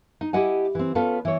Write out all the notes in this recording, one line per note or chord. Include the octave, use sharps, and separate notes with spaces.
D#4
E4 G4 D#5 F#5 G#5
E3 C4
B3 C#4 F4 A4 B4
E3 C#5